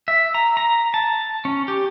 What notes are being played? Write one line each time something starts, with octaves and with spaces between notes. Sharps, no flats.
E5
A#5
A#5
A5
C#4
G4